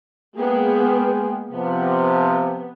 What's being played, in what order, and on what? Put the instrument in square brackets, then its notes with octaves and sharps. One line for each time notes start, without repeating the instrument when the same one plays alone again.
[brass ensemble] G#3 G5 [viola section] A#3 B3 G#4
[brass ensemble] C3 F3 [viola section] B3